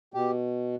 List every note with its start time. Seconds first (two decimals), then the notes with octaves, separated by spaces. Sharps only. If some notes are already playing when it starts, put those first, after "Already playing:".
0.14 B2 G4